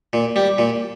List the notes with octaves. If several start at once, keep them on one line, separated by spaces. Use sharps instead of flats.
A#2
G3
A#2